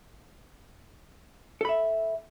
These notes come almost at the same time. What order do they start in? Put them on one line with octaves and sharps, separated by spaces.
A4 B5 E5